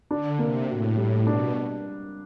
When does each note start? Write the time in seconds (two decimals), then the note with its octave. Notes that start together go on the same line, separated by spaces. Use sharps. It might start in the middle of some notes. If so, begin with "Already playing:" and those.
0.11 D3 D4
0.39 C3 A#3
0.68 A2 F#4
0.97 A2 G3
1.26 B2 D4